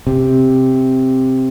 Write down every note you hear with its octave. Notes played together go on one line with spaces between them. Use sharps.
C3